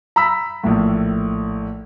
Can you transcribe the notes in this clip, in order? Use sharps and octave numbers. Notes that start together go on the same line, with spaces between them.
A#5 B5 E6 B6
A#1 A2